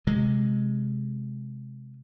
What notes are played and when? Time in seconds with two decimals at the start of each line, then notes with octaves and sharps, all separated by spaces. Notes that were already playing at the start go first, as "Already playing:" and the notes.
0.07 C3 G#3